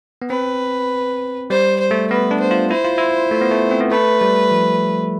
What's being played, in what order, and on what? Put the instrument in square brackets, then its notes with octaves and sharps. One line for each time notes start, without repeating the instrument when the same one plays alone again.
[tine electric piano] B3
[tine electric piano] C4 [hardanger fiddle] B4
[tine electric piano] G3 [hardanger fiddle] C5
[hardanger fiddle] C5
[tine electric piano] A3
[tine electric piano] B3 [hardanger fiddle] B4
[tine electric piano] D4
[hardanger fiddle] C5
[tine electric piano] F4
[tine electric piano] E4 [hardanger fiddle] C5
[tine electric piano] F4
E4
A3
B3
A3
C4
B3
[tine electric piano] A3 [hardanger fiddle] B4
[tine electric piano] G3
F3